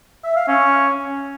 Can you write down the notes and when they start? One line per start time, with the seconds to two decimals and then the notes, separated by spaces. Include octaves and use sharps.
0.24 E5
0.36 F5
0.48 C#4